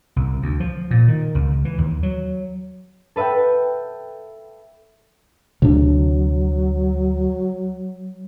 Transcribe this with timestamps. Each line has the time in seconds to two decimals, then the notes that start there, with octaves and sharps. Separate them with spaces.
0.16 C2
0.42 D2
0.60 F3
0.91 A#2
1.08 D#3
1.35 C#2
1.65 E3
1.78 D#2
2.03 F#3
3.16 A4 B4 E5 F#5 G5
5.62 D2 C3 F#3 D4